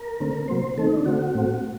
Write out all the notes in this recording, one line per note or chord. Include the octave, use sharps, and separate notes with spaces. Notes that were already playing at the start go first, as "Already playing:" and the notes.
Already playing: A#4
D3 A3 C4
C3 F#3 A#3 C5
D#3 A3 C4 A4
D#4
D4
D3 A3 C4 F#4
A2 A3 C4